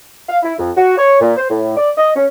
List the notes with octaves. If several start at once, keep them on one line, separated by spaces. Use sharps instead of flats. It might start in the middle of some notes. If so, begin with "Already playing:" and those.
F5
E4
F2
F#4
C#5
A#2
C5
A2
D5
D#5
C#4